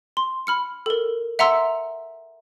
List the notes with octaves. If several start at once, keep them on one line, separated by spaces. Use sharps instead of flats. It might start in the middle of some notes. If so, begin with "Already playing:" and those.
C6
B5 F6 C#7
A4 A#4
E5 F#5 A#5 C6 E6